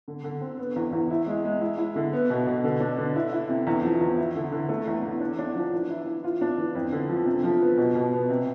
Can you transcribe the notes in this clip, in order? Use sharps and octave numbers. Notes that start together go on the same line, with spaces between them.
D3
D3
C4
B3
E2
E2
E4
G#3
G#3
E4
E4
D3
B3
B2
B2
D3
D4
D3
E4
E4
C3
E2
F3
E2
E4
D3
D3
A3
E2
E2
D4
D4
F3
E3
E4
E3
F4
D4
E3
F2
D3
F3
C3
F3
B3
B2
B2
B3
C3